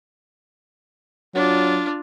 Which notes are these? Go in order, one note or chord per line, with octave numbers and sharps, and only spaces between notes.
F#3 D4 F4